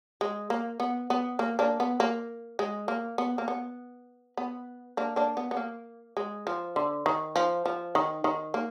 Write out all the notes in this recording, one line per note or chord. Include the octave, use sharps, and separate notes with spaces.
G#3
A#3
B3
B3
A#3
A#3 D4
B3
A#3
G#3
A#3
B3
A#3
B3
B3
A#3 D4
A#3 D4
B3
B3
A#3
G#3
F3
D3
D#3
F3
F3
D#3
D#3
A#3